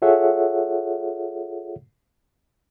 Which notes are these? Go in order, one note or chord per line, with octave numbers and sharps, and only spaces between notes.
F4 G#4 A4 C#5 E5 F#5